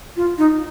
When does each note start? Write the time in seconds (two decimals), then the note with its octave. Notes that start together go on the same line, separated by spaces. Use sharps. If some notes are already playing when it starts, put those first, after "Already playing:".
0.16 F4
0.38 D#4